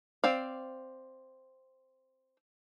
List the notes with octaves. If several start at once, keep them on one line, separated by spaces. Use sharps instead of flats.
C4 D5 F5